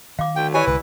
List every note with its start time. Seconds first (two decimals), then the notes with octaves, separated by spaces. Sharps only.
0.19 D#3 F5 D6
0.36 D2 G5
0.54 E3 G4 C#5 D5 G#5
0.67 C2 D3 G#3 B4